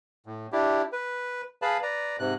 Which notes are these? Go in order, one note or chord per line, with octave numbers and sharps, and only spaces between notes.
A2
D4 E4 G4
B4
G#4 B4 F5 A5 B5
B4 D5 A#5
G#2 C3 F#6